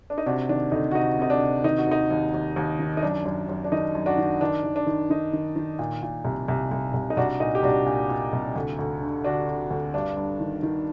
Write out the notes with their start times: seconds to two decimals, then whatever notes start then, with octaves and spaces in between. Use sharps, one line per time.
0.10 D4
0.18 D#4
0.26 C3 D4 F#4
0.49 D#3 D4
0.72 D2 D#4
0.91 F#4
0.95 C3 D#4
1.19 C3 D#4
1.30 D4
1.41 C3
1.64 D#3 D#4
1.78 F#4
1.87 D#2 D#4
2.11 D#2
2.34 D#2
2.56 D#2
2.79 D#3
2.97 D#4
3.03 F#2 D4
3.25 F#2
3.49 F#2
3.64 D4
3.72 D#3 D#4
3.95 F#2
4.06 D4 F#4
4.18 D#3
4.41 D#3 D4
4.64 D#3
4.76 D4
4.87 D#3
5.10 D#3 D#4
5.33 D#3
5.56 D#3
5.79 A#2
6.03 A#2
6.25 C2
6.48 C2
6.72 C2
6.94 C2
7.10 D#4
7.17 C2 D4 F#4
7.40 A#2 D#4
7.55 G4
7.63 C2 D4 F#4
7.86 A#2
8.09 A#2
8.33 C2
8.56 D2
8.79 D2
9.01 D3
9.24 D3 D4 F#4
9.48 D3
9.71 D2
9.94 G2 D4
10.17 G2
10.40 D#3
10.63 D#3